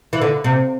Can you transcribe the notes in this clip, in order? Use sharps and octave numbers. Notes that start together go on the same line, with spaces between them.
E3
D3
C3